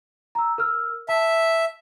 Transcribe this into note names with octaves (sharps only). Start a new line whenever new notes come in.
A#5 E6
A#4 E6 F6
E5 A5